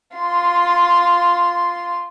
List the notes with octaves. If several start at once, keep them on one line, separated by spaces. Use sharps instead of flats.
F4 C6